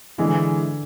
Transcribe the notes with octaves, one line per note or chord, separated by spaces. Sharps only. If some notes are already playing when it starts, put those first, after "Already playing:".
D3 E3 G#3